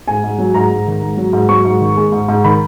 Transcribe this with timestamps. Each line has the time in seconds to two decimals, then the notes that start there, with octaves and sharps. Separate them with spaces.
0.08 G#2 G#5
0.24 G#2
0.38 F#3
0.54 G#2 A#5
0.70 G#2
0.87 D#3
1.02 G#2
1.17 F#3
1.33 G#2
1.49 F#3 C#6
1.65 G#2
1.81 D#3
1.97 G#3
2.12 G#2
2.28 G#2
2.44 D#3 B5